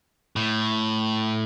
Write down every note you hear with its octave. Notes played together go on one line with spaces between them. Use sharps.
A2